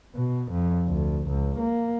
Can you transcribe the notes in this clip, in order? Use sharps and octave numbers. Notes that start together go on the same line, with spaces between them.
B2
F2
D2
C#2
A#3